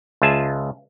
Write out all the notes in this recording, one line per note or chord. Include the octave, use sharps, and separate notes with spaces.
C#2 F4 G#4 E5 G#5 A5